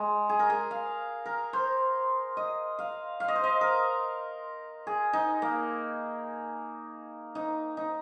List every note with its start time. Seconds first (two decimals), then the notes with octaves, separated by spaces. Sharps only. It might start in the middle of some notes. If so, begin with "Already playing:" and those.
Already playing: G#3
0.29 G#4
0.39 A#4
0.50 G#4
0.71 F5
1.26 A#4
1.53 C5
2.37 D#5
2.79 F5
3.20 F5
3.28 D#5
3.36 C5
3.44 D#5
3.61 A#4
4.87 G#4
5.13 D#4
5.42 A#3
7.35 D#4
7.77 D#4